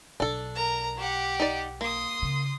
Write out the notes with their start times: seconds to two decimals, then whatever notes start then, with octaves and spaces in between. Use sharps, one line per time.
0.20 B1 D4 A4
0.55 A#4 A#5
0.97 G4 F#5
1.40 D#4 D5
1.81 A#3 C6 D#6
2.22 C#3